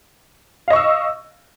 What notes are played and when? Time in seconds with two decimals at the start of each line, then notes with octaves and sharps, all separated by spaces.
0.68 F5
0.70 D#5
0.73 C#6
0.76 E6